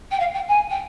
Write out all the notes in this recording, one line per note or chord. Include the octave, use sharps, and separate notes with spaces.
G5
F5
G5
G#5
G5